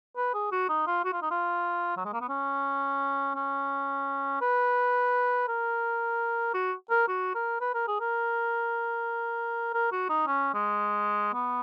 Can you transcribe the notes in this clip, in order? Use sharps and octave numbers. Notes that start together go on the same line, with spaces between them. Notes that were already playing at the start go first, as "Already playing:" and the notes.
B4
G#4
F#4
D#4
F4
F#4
F4
D#4
F4
F#3
G#3
A#3
B3
C#4
C#4
B4
A#4
F#4
A#4
F#4
A#4
B4
A#4
G#4
A#4
A#4
F#4
D#4
C#4
G#3
B3